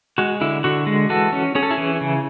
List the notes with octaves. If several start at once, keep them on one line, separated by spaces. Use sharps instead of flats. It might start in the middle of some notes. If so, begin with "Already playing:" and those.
G#3 F#4
D3 E4
D3 F#4
G#3
E3 F#4 A4
C#4
C#4 G#4
A4
E4 G#4
E3
C#3